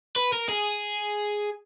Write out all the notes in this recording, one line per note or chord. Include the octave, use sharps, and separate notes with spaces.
B4
A#4
G#4